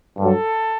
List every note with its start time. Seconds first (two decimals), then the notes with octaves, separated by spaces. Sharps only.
0.18 G2 F#3 A4